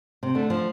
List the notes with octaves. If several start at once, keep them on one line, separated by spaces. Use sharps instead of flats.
C3
D3 A3
F3